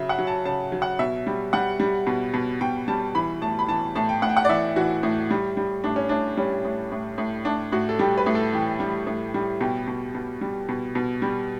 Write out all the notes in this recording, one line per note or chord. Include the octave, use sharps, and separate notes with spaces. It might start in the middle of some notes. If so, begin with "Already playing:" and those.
Already playing: C#3 F#3 E5
F#5
F#3
A5
C#3 A5
F#3
F#5
B2 E5
G3
G3 F#5
G3
B2
B2
B2 G5
G3 A5
E3 B5
A2 A5
B5
E3 A5
A2 A5
G5
A2 F#5
G5
F#5
D5
E3 E5
E3 F#4
A2
G3
G3
A2 D4
C#4
A2 D4
G3 C#4
A2
A2
A2
A2 D4
A2 F#4
A4
G3 G4
B4
A2
A4
E3 G4
G3
A2
G3
B2 G4
B2
B2
G3
B2
B2
G3